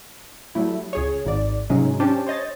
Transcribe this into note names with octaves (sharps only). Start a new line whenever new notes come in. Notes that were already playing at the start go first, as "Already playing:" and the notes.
F#3 G3 A3 E4
C#2 G#4 C#5
G#1 G#2 D5
G#2 C3 F#3 G#3 C#4 D#4
C#4 D4 G4 C5 G5 A5
C5 C#5 D#5 A6